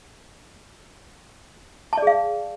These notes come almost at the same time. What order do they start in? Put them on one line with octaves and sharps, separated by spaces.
A5 D5 G#4 F5